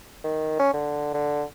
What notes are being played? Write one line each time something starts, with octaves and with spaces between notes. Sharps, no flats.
D#3
C#4
D3
D3